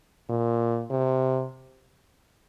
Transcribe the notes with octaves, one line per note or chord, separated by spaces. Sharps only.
A#2
C3